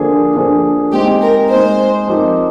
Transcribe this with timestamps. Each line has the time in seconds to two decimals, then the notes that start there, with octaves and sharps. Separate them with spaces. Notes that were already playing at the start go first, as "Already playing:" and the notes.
Already playing: D3 F3 A#3 D4 G#4
0.35 D3 F3 A#3 D4 G#4
0.92 G#3 C4 D#4 G4
1.22 A#4
1.50 G#3 C4 D#4 C5
2.07 F3 C4 D#4 G4 A#4